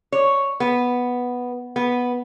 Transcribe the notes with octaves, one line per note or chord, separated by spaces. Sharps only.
C#5
B3
B3